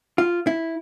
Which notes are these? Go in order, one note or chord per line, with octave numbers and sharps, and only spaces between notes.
F4
E4